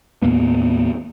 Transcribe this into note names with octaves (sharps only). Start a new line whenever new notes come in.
D#2 A2 A#3 B3